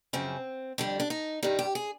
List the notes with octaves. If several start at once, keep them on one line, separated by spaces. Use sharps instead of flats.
F#2 C#3 F3 C4
F2 D3 G3 D4
D4
D#4
G2 D#3 G3 D#4
G4
G#4